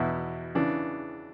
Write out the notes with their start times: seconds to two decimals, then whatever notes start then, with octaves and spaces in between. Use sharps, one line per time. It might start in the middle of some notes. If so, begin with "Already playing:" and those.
Already playing: E2 B2 E4
0.55 C#3 E3 D4